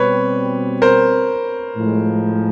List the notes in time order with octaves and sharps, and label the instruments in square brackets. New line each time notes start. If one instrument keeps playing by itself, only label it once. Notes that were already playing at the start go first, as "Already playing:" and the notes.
Already playing: [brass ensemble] B2 G3 C4 [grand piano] B4 C#5
[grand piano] A#4 C5
[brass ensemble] A2 F3 G#3